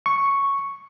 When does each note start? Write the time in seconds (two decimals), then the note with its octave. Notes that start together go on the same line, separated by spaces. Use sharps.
0.06 C#6